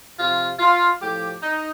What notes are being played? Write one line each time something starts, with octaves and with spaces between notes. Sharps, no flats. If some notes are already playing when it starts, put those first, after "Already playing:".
C3 F3 F4
F4
A2 F3 G4
D#4